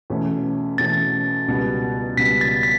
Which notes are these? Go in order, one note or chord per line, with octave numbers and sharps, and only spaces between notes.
E2 B2 A3 C#4
E2 B2 A3 C#4 A6
C#2 B2 G3 B3
C#2 B2 G3 B3 B6
A6
B6